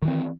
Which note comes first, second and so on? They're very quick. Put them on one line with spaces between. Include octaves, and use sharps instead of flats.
D#3 E3 C4